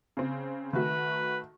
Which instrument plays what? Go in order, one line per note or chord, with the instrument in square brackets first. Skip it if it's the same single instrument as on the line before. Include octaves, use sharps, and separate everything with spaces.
[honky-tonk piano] C#3 C4
[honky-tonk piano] D#3 A3 F#4 [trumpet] B4